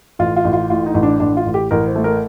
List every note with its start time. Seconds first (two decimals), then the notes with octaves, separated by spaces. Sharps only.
0.19 A1 F4
0.36 F4
0.45 A1
0.53 F4
0.70 A2 F4
0.86 D#4
0.94 A1
1.03 D4
1.20 A1 D4
1.37 F4
1.45 A1
1.54 G4
1.71 A1 A#4
1.87 C5
1.96 A3
2.04 A#4